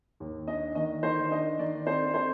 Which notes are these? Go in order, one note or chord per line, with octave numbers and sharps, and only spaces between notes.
D#2
D4 D#5
D#3 D#5
D#3 C5
D4 D#5
D#3 D5
C4 C5
C4 C5